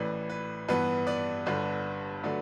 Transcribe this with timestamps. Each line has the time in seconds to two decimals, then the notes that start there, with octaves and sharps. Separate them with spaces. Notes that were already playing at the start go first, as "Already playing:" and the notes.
Already playing: A1 A2 E3 B4 D5
0.30 B4
0.68 G2 E3 B3 B4
1.07 B4 D5
1.46 G1 G2 D3 B4 D5
2.23 D3 F#3 A3 B4 D5